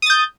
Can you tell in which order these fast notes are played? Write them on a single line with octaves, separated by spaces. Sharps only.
D#6 A6 G6